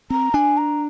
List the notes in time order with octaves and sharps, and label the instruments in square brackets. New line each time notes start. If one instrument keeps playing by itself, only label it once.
[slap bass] C4 [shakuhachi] A#5
[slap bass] D4 [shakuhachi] G#5
[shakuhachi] A#5